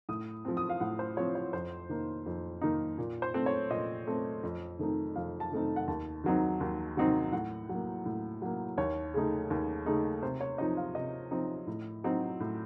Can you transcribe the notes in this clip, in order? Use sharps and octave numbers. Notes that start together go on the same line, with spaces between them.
A2 D#6
F3 C4
D#6
F5
A2 F#5
C5
F3 C4 C#5
C#5
F2 C5
D#3 A#3 D#4
F2
D#3 A#3 D#4
A#2
C5
A3 C4
C#5
A#2 D#5
A3 C4
F2
D#3 A3 C4 D#4
F2 F5
A5
D#3 A3 C4 D#4
F#5
D#2 A5
D#3 F#3 C4 D#4
D#2
D#3 F#3 C4 D#4
A2 F#5
F#3 A#3
A2
F#3 A#3
D#2 C#5
C#3 A3 D#4
D#2
C#3 A3 D#4
C3 C5
C#5
F3 C4 D#4 D#5
F5
C3 D#5
F3 C4 D#4
A2
F#3 C4 D#4
A2